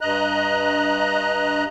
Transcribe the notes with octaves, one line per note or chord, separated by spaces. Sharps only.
G2 D#5 A#5 F#6